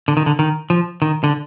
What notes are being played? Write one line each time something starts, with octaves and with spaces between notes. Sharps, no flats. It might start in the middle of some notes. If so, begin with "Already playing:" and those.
D3
D#3
D3
D#3
F3
D#3
D3